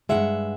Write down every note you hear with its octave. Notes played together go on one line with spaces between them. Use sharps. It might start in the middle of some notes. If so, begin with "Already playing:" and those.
D#3 G#3 E5 F#5
G2